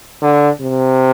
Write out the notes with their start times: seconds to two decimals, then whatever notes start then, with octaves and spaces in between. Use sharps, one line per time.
0.22 D3
0.61 C3